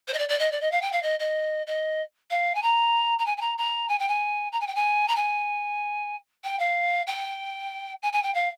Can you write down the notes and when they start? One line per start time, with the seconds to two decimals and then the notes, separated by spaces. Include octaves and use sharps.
0.08 C5
0.14 D#5
0.18 D5
0.29 D5
0.39 D#5
0.52 D5
0.61 D#5
0.72 F5
0.82 G5
0.92 F5
1.03 D#5
1.20 D#5
1.67 D#5
2.31 F5
2.55 G#5
2.62 A#5
3.19 A#5
3.26 G#5
3.37 G#5
3.41 A#5
3.58 A#5
3.89 G#5
3.99 G5
4.08 G#5
4.52 A#5
4.61 G#5
4.67 G5
4.75 G#5
5.08 A#5
5.16 G#5
6.44 G5
6.59 F5
7.07 G5
8.03 G#5
8.13 G#5
8.23 G5
8.34 F5